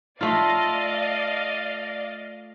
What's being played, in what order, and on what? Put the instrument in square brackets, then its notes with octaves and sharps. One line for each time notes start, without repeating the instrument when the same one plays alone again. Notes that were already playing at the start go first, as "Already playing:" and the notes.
[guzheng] A3 F4 [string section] D5 D#5 F5